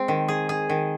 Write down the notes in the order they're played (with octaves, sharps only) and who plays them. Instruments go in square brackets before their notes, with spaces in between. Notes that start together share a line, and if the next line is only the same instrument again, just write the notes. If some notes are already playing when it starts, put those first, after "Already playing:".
Already playing: [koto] G#3 C4
D#3
G#4
G#4
D#3